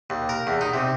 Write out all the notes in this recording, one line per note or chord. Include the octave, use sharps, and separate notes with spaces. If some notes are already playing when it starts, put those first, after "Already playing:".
D#2
A#4
E2
D#4
C3